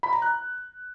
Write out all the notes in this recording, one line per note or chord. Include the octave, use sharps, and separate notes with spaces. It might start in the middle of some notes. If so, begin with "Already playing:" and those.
B5
A#5
F#6